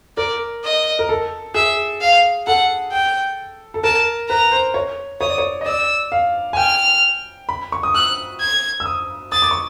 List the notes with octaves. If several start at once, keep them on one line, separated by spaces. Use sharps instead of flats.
A#4 D5
D#5
A#4
A4
G#4 E5
F5
A4 F#5
G5
A4
A#4 A5
B4 A#5
C5
C#5
C#5 D#6
D5
C#5
D#5
D5 E6
F5
G#5
G5 F6
B5
C#6
D#6
E6 F#6
G#6
E6
D#6
D#6 A6
D6
C#6